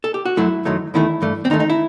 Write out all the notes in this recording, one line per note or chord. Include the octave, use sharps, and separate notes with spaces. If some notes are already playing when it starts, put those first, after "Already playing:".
A4
G4
F#4
F#2 F#3 A3 E4
F#2 D#3 F#3 A3
E2 D#3 A3 E4
G2 E3 A3
C4
D#2 D#3 A3 D#4
D#4
E4